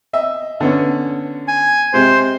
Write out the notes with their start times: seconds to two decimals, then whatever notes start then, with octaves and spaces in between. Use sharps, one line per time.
0.13 D#5 E5
0.60 D3 B3 C#4
1.48 G#5
1.94 C3 G#3 C5